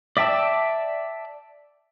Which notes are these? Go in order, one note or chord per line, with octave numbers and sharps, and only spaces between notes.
D5 E5 G5 A5 E6